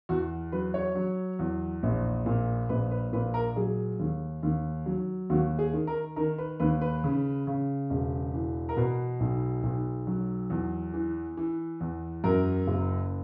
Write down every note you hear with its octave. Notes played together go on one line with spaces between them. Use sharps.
E2 F#4
F#3 B4
C#5
F#3
E2
A#1
A#2
A#1 B4
B4
A#2 B4
A#4
F#3 G#4
D#2
D#2
F#3
D#2 F#4
G#4
D#3
A#4
D#3 A#4
B4
D#2 B4
B4
C#3
C#3
E1
E3
A#4
B2 B4
B1
B1
F#3
E2
E3
E3
E2
F#2 A#4
F#1